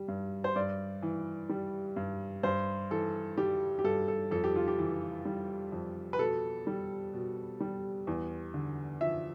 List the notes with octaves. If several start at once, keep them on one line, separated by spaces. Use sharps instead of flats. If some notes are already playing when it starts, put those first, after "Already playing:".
Already playing: G3
G2
C5
G2 D5
E3
G3
G2
G2 C5
E3 A4
G3 G4
G4
G2 A4
A4
F2 A4
G4
F4
G4
E3
G3
F2
B4
B2 A4
G3
B2
G3
E2
D3
F3 E5